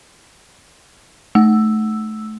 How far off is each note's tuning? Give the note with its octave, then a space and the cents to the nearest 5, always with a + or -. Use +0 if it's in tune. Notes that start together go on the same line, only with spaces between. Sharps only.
A3 -20 E6 +0